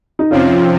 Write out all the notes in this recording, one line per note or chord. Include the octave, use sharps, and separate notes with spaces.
D#4
F2 C3 F3 C4 C#4 F4